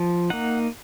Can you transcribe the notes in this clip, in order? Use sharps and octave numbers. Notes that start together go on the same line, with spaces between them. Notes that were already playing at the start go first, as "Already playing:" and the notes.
Already playing: F3
A#3 D#4 F#5